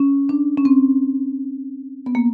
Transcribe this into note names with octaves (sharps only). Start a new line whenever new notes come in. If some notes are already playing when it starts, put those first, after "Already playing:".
Already playing: C#4
D4
C#4
C4
B3
A#3